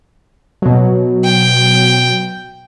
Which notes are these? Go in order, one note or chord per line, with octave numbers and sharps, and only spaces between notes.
B2 F#3
G5